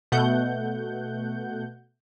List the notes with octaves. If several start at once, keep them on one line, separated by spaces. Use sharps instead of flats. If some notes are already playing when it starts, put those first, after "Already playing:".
B2 A3 F#5 G6